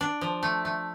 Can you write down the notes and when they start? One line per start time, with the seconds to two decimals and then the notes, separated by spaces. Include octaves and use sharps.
0.01 D4
0.21 F3
0.43 A3
0.65 A3